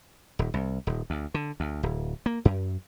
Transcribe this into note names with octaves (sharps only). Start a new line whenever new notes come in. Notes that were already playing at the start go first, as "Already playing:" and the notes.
D#1
C2
D#1
D2
D3
D2
D1
A#3
F#2